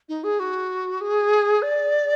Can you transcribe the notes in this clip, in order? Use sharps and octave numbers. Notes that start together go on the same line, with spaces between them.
D#4
G#4
F#4
G#4
D5